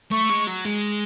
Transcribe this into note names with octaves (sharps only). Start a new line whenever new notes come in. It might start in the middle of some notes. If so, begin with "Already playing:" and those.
A3 C#6
G#3
F#3
G#3